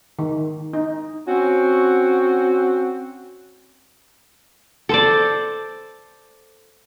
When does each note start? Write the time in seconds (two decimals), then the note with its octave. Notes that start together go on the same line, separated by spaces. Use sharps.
0.19 D#3
0.73 D#4
1.27 C4 C#4 F#4
4.89 A4 C5 D5